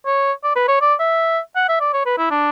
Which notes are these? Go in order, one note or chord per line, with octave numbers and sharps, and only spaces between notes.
C#5
D5
B4
C#5
D5
E5
F#5
E5
D5
C#5
B4
E4
D4